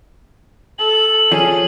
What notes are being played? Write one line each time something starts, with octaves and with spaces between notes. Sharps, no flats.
A4 F#7
F3 C#4 G#4